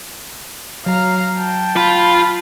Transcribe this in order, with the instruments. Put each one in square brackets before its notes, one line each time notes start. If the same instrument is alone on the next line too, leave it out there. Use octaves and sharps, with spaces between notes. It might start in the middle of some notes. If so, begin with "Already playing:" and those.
[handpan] F#3 [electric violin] F5 A#5
[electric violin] G5 A5
[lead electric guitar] F4 [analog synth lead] B5